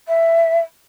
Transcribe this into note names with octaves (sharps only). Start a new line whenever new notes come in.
E5